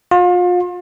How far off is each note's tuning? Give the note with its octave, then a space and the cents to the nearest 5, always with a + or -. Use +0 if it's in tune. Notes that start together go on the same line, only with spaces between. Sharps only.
F4 +35